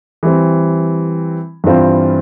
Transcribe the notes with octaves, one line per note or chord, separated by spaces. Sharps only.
E3 G3 C4
G2 E3 G3 C4 F4